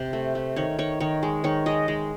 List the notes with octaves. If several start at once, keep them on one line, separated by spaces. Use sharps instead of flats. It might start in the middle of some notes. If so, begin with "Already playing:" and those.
Already playing: C3
A3
A3
D#3 C#5
D#3 C#5
D#3 C#5
G#3
D#3 C#5
G#3 D#5
G#3